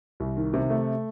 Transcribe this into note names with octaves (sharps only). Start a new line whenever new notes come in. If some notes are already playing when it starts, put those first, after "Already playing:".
C2
D#3
C3
A3